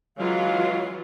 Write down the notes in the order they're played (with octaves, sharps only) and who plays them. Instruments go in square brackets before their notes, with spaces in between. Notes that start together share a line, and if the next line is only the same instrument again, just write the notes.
[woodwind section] C#3 G#3 F5 [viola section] E3 F#3 F4